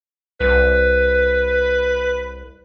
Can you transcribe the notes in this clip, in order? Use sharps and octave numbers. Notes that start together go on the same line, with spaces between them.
C2 B4